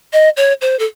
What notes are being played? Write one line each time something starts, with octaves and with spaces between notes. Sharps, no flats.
D#5
C#5
C5
A4